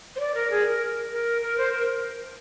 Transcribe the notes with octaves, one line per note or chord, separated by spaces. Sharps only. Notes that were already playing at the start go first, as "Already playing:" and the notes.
C5
D5
A#4
G#4
A#4
A#4
A#4
C5
A#4